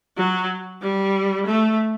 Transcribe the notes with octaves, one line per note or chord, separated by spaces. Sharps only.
F#3
G3
A3